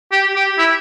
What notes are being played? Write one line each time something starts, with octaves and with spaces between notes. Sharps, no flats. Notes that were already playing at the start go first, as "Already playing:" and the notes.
G4
G4
E4